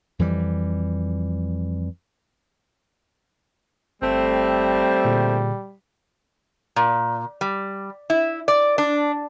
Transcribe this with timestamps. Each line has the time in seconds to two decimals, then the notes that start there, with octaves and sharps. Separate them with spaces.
0.19 F2 E3 G3
4.02 G1 G3 A3 C4
5.05 A#2 D3 G#4
6.76 A#2
7.41 G3
8.10 E4
8.48 D5
8.78 D4